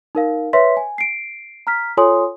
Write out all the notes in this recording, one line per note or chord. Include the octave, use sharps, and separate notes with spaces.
D#4 A#4 F5
B4 C#5 E5 C6 B6
G#5
C7 D7
A#5 F6 B6
F4 A4 C#5 G#5 C6 D#6